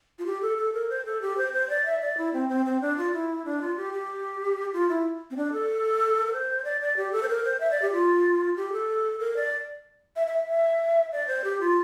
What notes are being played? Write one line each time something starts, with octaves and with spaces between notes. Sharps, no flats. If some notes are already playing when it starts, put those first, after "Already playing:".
F4
G4
A4
A4
A#4
C5
A4
G4
C5
C5
D5
E5
D5
E4
C4
C4
C4
D4
F4
E4
D4
F4
G4
G4
F4
E4
C4
D4
A4
A#4
C5
D5
D5
G4
A4
C5
A#4
C5
E5
D5
G4
F4
G4
A4
A#4
D5
E5
E5
E5
D5
C5
G4
F4